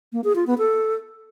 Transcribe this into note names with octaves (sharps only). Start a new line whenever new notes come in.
A#3
G#4
F4
B3
A4